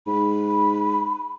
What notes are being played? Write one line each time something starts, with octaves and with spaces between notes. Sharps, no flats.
G#2 B5